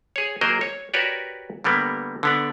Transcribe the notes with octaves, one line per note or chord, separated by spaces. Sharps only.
G#4 C#5
F#3 A#3 G#4 A#4 C5 D#5
C#5
F#4 G4 A#4 B4 C#5 D5
D3 G3 A#3 B3
D3 B3 D5